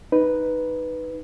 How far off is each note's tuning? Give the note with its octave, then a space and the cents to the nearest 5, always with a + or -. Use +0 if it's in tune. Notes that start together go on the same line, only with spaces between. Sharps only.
D#4 +0 B4 +0